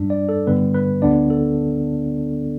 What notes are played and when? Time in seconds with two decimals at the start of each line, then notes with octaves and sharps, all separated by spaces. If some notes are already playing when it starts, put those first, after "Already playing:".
Already playing: G2 G3 D4
0.10 D5
0.29 A4
0.47 G2 D3 G3 B3 B4
0.74 B4
1.02 D2 D3 B3 D4 D5
1.30 A4